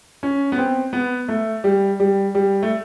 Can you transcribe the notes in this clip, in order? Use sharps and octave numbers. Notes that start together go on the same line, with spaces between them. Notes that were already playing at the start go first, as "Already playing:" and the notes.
C#4
B3
C4
B3
A3
G3
G3
G3
A3